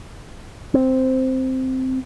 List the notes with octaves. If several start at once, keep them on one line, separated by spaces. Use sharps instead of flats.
C4